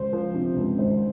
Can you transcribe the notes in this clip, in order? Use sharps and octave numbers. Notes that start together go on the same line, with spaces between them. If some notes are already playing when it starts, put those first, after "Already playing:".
Already playing: C#2 C5
F3
C3
C#2
G#1 C5